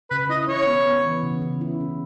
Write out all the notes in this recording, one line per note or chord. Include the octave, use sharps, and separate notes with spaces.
C#3 B4
E4 D#5
E4 C#5
B3
B3
E3
C#3
C#3
E4
C#3